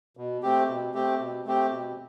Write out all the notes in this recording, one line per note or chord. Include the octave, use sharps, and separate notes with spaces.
B2
A3 C4 G4
B2
A3 C4 G4
B2
A3 C4 G4
B2